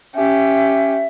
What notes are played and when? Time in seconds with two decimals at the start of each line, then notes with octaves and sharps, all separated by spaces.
0.16 C#4 G4 E5